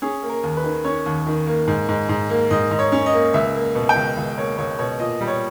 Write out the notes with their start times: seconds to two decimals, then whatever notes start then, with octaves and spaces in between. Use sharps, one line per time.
0.02 C#4 G#4
0.23 A#3
0.29 A#4
0.43 D#2
0.57 B4
0.64 D#3
0.85 C#4 C#5
1.06 D#2
1.27 D#3
1.47 A#3
1.68 G#2
1.89 G#2
2.09 G#2
2.30 A#3
2.51 G#2 D#5
2.71 G#2
2.79 C#5
2.92 C#4
3.06 D#5
3.13 A#3
3.34 C#2 E5
3.55 A#3
3.75 B2
3.89 G5
3.96 C#2
4.17 C#2
4.37 A#3 C#5
4.58 C#2 C#5
4.79 B2 C#5
4.99 A#2 D#5
5.21 G3
5.28 C#5